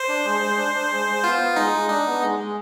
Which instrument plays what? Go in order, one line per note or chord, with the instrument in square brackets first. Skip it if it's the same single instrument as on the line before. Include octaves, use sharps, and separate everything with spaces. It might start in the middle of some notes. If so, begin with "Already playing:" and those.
Already playing: [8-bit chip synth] C5
[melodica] D4
G#3
G#3
D4
D4
G#3
G#3
[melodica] B3 [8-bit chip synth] F4
[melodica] B3
[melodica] G#3 [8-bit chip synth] D#4
[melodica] G#3
[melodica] D4 [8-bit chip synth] D#4
[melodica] B3
G#3
G#3